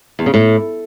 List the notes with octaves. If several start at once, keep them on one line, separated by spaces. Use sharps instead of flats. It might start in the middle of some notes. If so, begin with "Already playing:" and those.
E2
C#3
A2